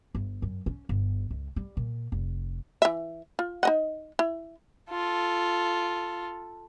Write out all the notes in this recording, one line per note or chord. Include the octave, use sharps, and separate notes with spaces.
G1
F#2
C#4
G1
C#2
G3
A#2
F1
E3 E5
F4
D#4 D#5 F#5
E4
F4 A4